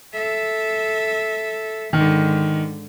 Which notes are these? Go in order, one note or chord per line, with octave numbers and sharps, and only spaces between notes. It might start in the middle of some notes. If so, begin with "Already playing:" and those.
A4 E5
G#2 D3 D#3